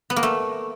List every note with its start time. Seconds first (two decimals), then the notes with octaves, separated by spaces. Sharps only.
0.10 B3
0.16 A#3
0.23 A3